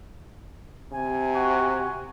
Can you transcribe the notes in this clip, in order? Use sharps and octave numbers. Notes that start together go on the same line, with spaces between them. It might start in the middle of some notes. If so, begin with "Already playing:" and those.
C3 G#5
F#4